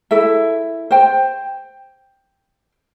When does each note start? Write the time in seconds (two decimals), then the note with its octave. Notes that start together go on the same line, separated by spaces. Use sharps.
0.11 E4 A4 E5
0.91 C5 G5